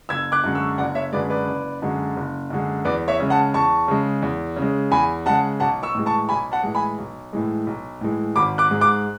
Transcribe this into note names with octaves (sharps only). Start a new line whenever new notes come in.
F#1 E6 G#6
D6 F#6
F#2 D3 G#3
C#6 E6
F#1 D5 F#5
C#5 E5
F#2 D3 G#3 B4 D5
B4 D5
F#1
F#2 D3 G#3
F#1
F#2 D3 G#3
E2 B4 D5
C#5 E5
C#3 G#3
F#5 A5
E2 A5 C#6
C#3 G#3
E2
C#3
G#3
E2 G#5 B5
C#3 G#3 F#5 A5
B1 F#5 A5
C#6 E6
A2 E3 G#3
A5 C#6
B1 G#5 B5
F#5 A5
A2 E3 G#3
G#5 B5
B1
A2 E3 G#3
B1
A2 E3 G#3
G#1 B5 D6
D6 F#6
G#2 G#3
D6 F#6